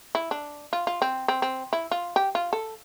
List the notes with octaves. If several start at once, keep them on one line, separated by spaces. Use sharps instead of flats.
E4
D4
F4
F4
C4
C4
C4
E4
F4
G4
F4
A4